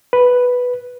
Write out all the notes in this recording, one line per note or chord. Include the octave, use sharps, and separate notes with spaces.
B4